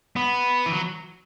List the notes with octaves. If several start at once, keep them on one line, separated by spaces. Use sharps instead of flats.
B3
E3
F#3